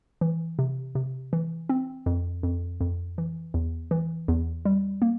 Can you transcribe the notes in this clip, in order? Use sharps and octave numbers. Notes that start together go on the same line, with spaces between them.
E3
C3
C3
E3
C4
F2
F2
F2
E3
E2
E3
E2
G3
A#3